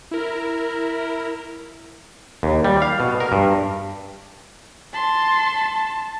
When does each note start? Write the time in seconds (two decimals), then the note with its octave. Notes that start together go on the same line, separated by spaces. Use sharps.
0.11 E4 A#4
2.43 D#2
2.64 G3
2.82 F5
3.00 B2
3.20 A#4
3.32 G2
4.94 A5 C6